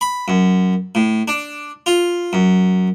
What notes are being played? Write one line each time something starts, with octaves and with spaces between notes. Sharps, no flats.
B5
F#2
A2
D4
F4
F#2